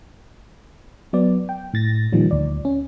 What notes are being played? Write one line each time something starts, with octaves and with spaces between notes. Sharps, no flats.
F#3 B3 D5
G5
A2 A6 A#6
A#2 D#3 F3 G3
D2 D5
C#4